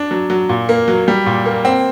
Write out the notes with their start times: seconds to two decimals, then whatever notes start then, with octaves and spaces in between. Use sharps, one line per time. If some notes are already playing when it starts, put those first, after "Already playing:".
Already playing: D4
0.11 F#3
0.30 F#3
0.49 A#2
0.69 A#3
0.88 F#3
1.08 G3
1.26 A#2
1.46 A#3
1.65 C4